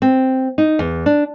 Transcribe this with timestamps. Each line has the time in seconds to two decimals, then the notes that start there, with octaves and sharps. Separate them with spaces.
0.02 C4
0.58 D#4
0.79 E2
1.06 D4